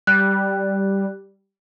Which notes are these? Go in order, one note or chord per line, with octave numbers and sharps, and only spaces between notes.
G3 F#6